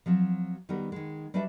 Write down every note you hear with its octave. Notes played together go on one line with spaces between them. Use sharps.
F3 F#3 C4
D#3 G3 B3 F#4 A#4
D#3 G#3
G3 D4 F#4 B4 D5 E5